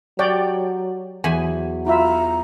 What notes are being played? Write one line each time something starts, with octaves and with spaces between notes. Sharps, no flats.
F#3 G4 C#5 D5 G5
E2 F#3 G#5 B5
E4 F4 E5 A#5